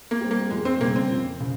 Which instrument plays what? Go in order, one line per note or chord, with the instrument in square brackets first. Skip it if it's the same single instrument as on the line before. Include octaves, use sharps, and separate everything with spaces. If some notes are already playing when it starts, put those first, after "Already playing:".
[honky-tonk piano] A#3
[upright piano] G3 C4 G4
[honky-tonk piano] A#3
[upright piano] F2 [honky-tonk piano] G#3
[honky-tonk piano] C4
[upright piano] C#3 G3 C#4 [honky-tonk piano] A#3
[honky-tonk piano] C4
[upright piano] F2
C#3